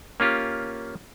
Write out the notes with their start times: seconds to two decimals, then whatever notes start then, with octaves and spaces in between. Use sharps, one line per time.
0.20 A#3 C#4 F4 G4